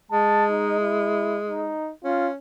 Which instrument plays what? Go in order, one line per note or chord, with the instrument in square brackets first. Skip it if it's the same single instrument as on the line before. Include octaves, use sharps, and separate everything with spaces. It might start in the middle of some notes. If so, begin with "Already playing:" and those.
[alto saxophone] G#3 [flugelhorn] A5
[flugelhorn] D#4
E4
D#4
[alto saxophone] C#4 [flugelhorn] F4